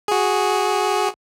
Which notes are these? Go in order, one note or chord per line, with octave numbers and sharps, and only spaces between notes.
F#4 G#4